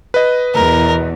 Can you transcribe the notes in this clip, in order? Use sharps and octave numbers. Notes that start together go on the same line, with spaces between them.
B4 D#5
E2 B2 A#4